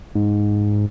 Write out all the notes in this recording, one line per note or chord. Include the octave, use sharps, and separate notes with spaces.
G#2